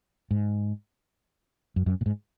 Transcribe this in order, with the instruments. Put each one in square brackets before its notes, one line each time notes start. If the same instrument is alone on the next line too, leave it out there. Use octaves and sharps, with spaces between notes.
[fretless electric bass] G#2
F#2
F#2
A#2
G#2